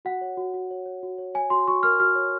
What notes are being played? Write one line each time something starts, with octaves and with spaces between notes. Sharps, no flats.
F#4 F#5
C#5
F#4
F#4
C#5
C#5
F#4
C#5
C#5 G#5
F#4 C6
F#4 C#6
A#4 F6
F#4 F6
C#5